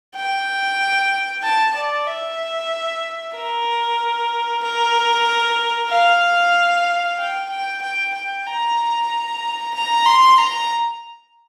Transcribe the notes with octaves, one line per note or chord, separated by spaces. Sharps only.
G5
A5
D5
E5
A#4
A#4
F5
G5
G5
G5
G5
A#5
A#5
C6
A#5